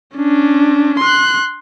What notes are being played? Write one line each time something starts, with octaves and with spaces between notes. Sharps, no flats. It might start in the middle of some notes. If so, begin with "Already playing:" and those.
C#4 D4
C6 F#6